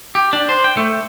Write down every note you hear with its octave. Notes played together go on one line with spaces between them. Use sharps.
G4
D4
C5
G5
A3